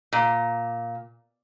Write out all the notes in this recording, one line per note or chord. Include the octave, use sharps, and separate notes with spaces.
A#2